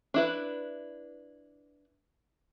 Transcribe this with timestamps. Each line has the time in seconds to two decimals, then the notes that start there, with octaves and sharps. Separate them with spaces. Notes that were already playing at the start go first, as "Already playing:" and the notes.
0.14 D4 E4 B4